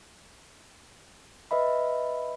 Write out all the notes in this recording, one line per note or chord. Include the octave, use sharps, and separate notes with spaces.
B4 D#5 E5 B5